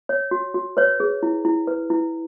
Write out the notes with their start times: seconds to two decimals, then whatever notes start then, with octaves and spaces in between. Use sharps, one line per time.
0.09 C#5
0.31 F#4
0.54 F#4
0.77 B4 C#5
1.00 G#4
1.23 E4
1.45 E4
1.67 B4
1.90 E4